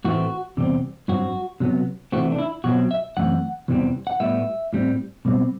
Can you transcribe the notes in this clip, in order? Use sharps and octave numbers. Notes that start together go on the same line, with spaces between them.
A2 E3 A3 C4 F#4
E2 C3 G3 C4
G2 F#3 C4 F#4
C3 F#3 B3
C3 E3 A3 C4 F#4
D4
E4
B2 F#3 C4 F#4
E5
F#2 E3 A3 C4 F#5
E2 C3 E3 G3 C4
F#5
A2 G3 B3 E5
A2 G3 C4
B2 G3 C4